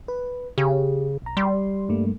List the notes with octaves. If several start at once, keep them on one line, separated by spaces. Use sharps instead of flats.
B4
C#3 G4
B1 A#5
G3 C6
G2 A3 A#3